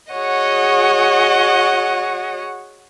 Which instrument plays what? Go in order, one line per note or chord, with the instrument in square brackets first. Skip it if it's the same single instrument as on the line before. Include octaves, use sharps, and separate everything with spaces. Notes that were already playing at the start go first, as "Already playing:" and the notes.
[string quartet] F#4 G#4 C#5 D#5 F#5